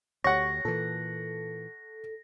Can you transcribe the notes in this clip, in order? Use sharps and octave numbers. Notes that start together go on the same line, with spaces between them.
D2 G4 C#5 F#5 C#6 A#6
A#2 E3 A4